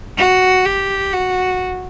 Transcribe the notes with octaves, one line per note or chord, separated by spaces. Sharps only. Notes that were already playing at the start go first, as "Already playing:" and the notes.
F#4
G4
F#4